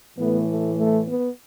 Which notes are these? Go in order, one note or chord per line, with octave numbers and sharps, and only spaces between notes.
A2 E3 A3 B3
A3
A3
B3